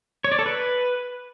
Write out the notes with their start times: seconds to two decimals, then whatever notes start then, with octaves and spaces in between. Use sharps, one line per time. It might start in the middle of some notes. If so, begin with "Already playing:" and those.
0.24 C#5
0.32 D5
0.39 A4
0.46 B4